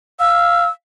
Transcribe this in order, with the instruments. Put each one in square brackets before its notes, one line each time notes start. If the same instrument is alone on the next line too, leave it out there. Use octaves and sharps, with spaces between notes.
[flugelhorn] F5 [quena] E6